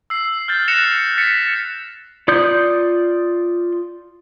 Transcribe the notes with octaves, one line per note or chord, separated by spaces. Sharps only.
E6 C7
F6 G6 A6
F#6 A6 A#6 C#7 E7 F7
A6 B6 C#7
F4 D5 D#6 G6